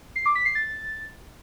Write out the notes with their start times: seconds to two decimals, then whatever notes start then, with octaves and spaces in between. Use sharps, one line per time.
0.16 C7
0.26 D6
0.35 B6
0.45 C7
0.55 A6